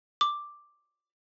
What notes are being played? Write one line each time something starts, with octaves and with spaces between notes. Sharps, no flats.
D6